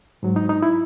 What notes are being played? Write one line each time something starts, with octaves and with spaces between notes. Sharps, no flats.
G#2 F#3
D#4
D#4
E4